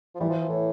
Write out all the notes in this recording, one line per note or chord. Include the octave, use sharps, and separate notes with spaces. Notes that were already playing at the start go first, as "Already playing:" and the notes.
F3
E3 G3
F3
F3
A2